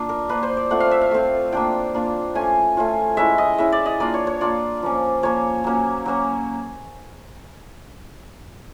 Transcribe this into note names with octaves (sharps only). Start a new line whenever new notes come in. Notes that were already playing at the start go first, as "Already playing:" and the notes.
Already playing: A#3 D4 F4
A#4
A#3 D4 F4 B4
C5
D5
A3 C4 F4 F#5
F5
E5
F5
A3 C4 F4
A#3 D4 F4 G5
A#3 D4 F4
A3 C#4 F4 G#5
A3 C#4 F4
G#3 C#4 E4 E5
D#5
G#3 C#4 E4 E5
D5
D#5
A#3 D4 F4 D5
C#5
C#5
A#3 D4 F4 D5
F3 A#3 C#4
F3 A#3 C#4 C#5
F#3 A#3 C#4
F#3 A#3 C#4